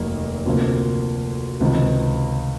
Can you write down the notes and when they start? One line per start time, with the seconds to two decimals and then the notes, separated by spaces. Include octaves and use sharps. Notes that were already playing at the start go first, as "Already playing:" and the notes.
Already playing: F1 D#2 D#3 F#3 A#3
0.46 D2 C3 F3 A#3
1.60 C#2 C3 D#3